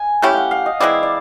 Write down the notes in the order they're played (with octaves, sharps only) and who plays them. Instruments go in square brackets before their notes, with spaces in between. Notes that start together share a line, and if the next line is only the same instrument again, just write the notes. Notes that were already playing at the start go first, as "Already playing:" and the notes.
Already playing: [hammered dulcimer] G#5
[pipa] A3 C#4 E4 G4 [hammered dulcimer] G5
[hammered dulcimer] F5 F#5
F5
D#5
[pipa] E3 G#3 C4 E4 [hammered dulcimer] D5
[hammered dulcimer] D5